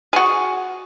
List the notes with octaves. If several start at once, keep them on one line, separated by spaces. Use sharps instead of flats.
F#4 G#4